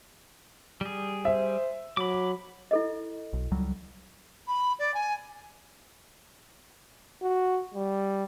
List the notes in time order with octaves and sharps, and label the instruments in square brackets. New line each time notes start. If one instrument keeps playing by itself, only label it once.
[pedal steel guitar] G3 G#4
[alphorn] C5 [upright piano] E5
[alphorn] F#3 [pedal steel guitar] B5 D6
[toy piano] E4 A4 D#5
[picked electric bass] B1
C#2 F#3 G3
[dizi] B5
D5
G#5
[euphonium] F#4
G3